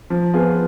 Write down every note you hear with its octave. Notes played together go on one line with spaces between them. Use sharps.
F3
B3 F4 G#4